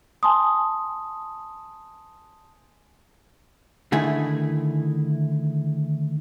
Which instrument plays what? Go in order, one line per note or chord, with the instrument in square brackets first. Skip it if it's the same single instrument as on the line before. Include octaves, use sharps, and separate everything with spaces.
[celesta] G#5 A5 C6 D#6
[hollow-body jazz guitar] D3 D#3 A3 E4 G#4